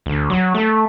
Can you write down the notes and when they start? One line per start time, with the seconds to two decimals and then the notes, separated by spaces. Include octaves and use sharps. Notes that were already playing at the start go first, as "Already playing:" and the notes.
0.06 D2
0.30 F#3
0.55 A3